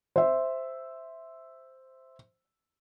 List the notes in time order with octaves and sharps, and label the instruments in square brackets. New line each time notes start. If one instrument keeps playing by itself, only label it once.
[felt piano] C5 E5